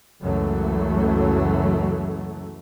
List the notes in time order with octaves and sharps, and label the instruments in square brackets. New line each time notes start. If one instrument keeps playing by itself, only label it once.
[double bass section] C#2 F#2 C#3 E3 F#3 A3